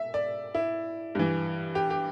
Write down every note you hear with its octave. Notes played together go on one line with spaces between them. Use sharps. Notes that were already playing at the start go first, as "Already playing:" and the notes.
Already playing: E5
D5
E4
G2 E3
G4
G4